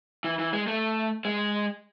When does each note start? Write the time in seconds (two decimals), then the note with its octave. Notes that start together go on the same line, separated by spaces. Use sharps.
0.24 E3
0.39 E3
0.53 G#3
0.67 A3
1.25 G#3